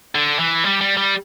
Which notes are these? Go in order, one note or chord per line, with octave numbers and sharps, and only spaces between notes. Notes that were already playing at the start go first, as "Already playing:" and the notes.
D3
E3
G3
G3
G3